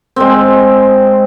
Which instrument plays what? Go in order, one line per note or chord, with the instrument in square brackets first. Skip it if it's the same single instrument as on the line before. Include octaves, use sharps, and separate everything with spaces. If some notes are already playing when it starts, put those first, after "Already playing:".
[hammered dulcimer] G#3 C4